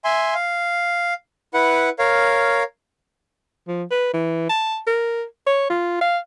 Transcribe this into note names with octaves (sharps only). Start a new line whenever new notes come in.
E5 G#5 C6
F5
E4 B4 F#5
A#4 C#5 F5
F3
B4
E3
A5
A#4
C#5
F4
F5